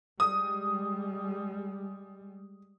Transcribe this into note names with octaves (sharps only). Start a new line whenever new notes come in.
G3 G#3 D#6